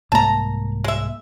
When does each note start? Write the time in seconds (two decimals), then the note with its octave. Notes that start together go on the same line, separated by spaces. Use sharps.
0.12 C2 G#2 A#3 A5 A#5
0.84 G#3 E5